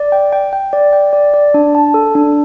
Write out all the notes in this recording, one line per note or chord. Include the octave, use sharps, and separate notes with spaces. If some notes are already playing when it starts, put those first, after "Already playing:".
Already playing: D5
G5
G5
G5
D5
G5
D5
D5
D4
A5
A4
D4